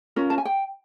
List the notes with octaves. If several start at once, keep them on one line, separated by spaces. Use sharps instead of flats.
C#4 F4 A#4
A5
G#5
G5